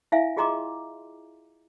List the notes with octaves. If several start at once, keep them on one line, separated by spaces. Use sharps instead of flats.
E4 E5 F5 G#5
F4 G#4 D#5 A#5 C6 D6